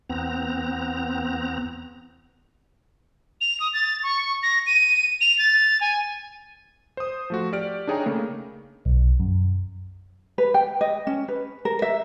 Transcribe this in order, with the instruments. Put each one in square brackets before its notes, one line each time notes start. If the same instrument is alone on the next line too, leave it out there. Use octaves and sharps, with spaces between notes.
[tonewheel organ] E2 B3 C4 A#5
[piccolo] F7
D#6
A6
C#6
A#6
D#7
F7
A6
G#5
[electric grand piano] C5 D#6
F3 A3 F#4
G4 D5 F6 D7
D4 D#4 G#4 C#5 G5 A#5
C#3 A3 A#3
[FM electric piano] B1
F#2
[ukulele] B4
G5
D#5
C#4
B4
A#4
E5